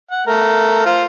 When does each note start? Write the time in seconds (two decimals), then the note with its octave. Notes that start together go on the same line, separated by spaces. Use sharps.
0.11 F#5
0.27 A3 A#4
0.86 F4 C5